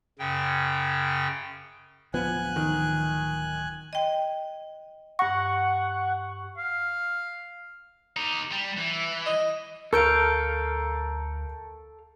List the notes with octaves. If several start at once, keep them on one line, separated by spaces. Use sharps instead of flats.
F#2 C#3 G5
D1 F3 B3 G#5 F#6
D#3
D#5 G5
G2 F#5 C#6 A#6
F5
D#4 G4
G3
E3
D#5
D2 A4 A#4 F5 C#6 G6 D7